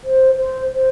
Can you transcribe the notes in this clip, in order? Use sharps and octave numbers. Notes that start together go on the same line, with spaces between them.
C5
C5
C5